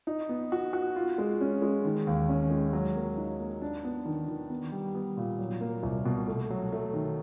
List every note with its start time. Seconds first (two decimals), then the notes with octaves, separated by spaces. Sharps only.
0.07 D#4
0.29 B3
0.52 F#4
0.73 F#4
0.96 F4
1.18 G#3
1.41 C#4
1.62 G#3
1.85 D#3
2.07 D#2
2.29 C#4
2.50 G#3
2.73 F#3
2.96 A#3
3.18 D#4
3.39 A#3
3.62 D4
3.85 B3
4.06 D#3
4.28 D#3
4.50 B3
4.72 G3
4.95 B3
5.17 A#2
5.39 F#3
5.61 A#3
5.83 C2
6.05 B2
6.28 A3
6.51 F#3
6.72 A3
6.94 D#3